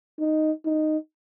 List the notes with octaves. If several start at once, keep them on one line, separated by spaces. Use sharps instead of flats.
D#4
D#4